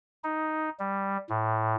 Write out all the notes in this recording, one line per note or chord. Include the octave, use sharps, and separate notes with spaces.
D#4
G3
A2